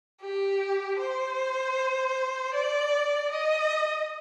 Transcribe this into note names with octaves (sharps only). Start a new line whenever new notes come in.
G4
C5
D5
D#5